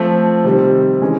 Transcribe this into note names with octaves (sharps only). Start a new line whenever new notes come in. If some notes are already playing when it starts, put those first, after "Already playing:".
Already playing: F3 A3 C4
C3 D#3 G3 C4
E3 G#3 C#4